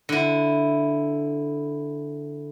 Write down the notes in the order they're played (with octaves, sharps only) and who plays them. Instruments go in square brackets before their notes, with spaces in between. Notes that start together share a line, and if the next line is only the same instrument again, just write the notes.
[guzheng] D3 E4